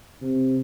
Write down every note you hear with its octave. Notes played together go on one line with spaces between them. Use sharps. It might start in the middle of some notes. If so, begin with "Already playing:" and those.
C3